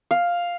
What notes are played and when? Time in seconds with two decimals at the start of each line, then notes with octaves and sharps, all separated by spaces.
0.11 F5